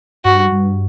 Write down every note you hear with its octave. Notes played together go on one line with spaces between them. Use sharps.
G2 F#4
G2